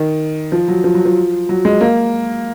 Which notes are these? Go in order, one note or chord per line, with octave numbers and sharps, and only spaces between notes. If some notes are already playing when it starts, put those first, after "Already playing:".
Already playing: D#3
F3
F#3
F3
F#3
F3
F#3
G#3
A#3